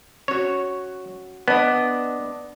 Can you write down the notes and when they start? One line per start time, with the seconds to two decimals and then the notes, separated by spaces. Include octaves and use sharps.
0.28 C#4 F#4 C#5
1.48 B3 D4 D#5